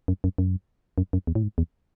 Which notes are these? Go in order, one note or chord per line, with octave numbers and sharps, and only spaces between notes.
F#2
F#2
F#2
F#2
F#2
E2
A2
G#2
E2